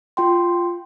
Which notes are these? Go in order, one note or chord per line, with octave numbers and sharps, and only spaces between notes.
F4 G5 C6